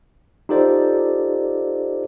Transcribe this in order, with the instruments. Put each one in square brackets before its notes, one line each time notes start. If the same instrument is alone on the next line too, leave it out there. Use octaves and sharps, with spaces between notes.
[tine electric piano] D#4 F4 G4 A4 C5 D5